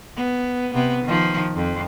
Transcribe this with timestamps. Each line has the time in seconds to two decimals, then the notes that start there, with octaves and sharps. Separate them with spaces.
0.16 B3
0.74 C3 B3
1.04 D#3 F3
1.55 F2